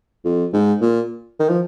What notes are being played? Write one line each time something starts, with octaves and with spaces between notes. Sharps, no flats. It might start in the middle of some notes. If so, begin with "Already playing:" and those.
F2
G#2
A#2
D#3
F3